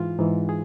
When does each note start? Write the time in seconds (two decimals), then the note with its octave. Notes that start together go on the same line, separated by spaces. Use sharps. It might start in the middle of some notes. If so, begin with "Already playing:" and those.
Already playing: G#2 E3 F4
0.19 G#2 E3
0.49 G#4